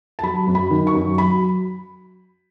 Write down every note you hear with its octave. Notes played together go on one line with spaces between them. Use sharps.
A5
F#3 B5
F#2
B5
D#3
C#6
F#2
F#3 B5